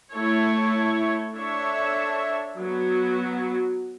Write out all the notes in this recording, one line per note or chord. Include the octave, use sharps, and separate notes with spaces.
A3 E4 A4 C#5
D4 A4 C#5 E5
F#3 B3 F#4